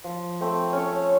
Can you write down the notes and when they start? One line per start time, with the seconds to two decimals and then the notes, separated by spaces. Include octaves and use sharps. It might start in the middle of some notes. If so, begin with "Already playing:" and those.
0.04 F3
0.41 A3 C4
0.73 C#4 A4 C#5